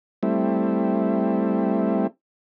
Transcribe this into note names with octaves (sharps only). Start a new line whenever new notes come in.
G3 A3 C4 E4